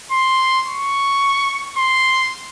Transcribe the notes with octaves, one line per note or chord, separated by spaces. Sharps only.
C6
C#6
C6